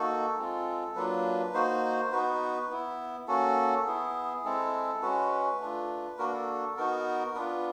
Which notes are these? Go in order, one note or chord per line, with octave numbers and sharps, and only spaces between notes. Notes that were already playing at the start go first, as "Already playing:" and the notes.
Already playing: A#3 D#4 F#4 A4
G#3 C4 F4
F#3 A#3 D4 F4 B4
A#3 D#4 F#4 C5
B3 D#4 F#4 B4
B3 E4
A#3 C#4 F#4 A4
B3 E4 G#4
G#3 C4 E4 A4
G#3 C#4 F#4 B4
A3 D4 F4
A#3 D4 F#4 A#4
A4
B3 D#4 F#4 A#4
B3 D4 F4 B4